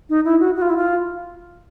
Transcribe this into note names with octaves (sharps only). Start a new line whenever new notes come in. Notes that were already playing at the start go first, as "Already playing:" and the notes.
D#4
E4
F#4
F#4
F4
E4
F4